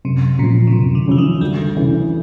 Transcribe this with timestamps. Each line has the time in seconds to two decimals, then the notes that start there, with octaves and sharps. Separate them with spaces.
0.05 F#2 C3
0.38 A#2 C#3 F3
0.67 C#3
0.73 F#2 C3
0.95 D3
1.07 C#3 E3 F3
1.18 D#3
1.41 D2 G3
1.76 C#3 E3 A3